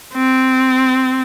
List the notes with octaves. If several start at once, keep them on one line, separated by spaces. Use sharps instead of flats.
C4